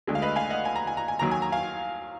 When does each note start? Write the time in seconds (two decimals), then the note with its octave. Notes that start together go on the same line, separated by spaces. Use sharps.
0.07 D2 D3 G#3
0.15 F5
0.22 B4 D#5
0.36 F5 G#5
0.50 D#5 F#5
0.65 G#5
0.76 A#5
0.87 G#5
0.97 A#5
1.08 G#5
1.19 D#2 D#3 F#3 A#5
1.31 G#5
1.42 A#5
1.52 F5 G#5